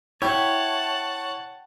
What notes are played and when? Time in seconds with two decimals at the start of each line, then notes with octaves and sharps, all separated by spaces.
0.22 E4 C#5 E5 F#5 G5 A5